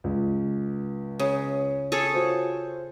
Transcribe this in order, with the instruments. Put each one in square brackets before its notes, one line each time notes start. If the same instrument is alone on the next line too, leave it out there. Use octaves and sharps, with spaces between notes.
[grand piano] C#2
[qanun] C#3
G#4 A4 C#5
[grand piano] F4 F#4 C5